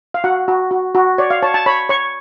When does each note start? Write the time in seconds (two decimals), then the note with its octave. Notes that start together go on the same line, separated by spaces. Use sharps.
0.14 F5
0.24 F#4 F#5
0.48 F#4
0.71 F#4
0.95 F#4
1.18 C#5 D5
1.30 F5
1.43 C#5 A5
1.54 A5
1.66 C#5 B5
1.89 C#5 C#6